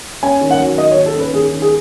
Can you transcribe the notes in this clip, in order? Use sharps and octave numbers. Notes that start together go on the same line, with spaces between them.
C#4 G#5
D#3
F#5
F#3
D#3 D#5
C#5
D#3
A4
C#4 B4
D#3 G#4
D#3
G#4